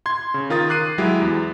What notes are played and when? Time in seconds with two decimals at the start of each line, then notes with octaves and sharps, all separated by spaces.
0.06 C6 G#6
0.34 C#3
0.50 D#3 F4 A#4 D#6 A6
0.69 D6 F#6 C7 D#7
0.98 F#3 G#3 E4 G4
1.22 E2